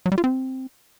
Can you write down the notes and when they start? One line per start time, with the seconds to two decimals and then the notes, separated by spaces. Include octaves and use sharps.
0.06 F#3
0.12 G3
0.18 F4
0.24 C4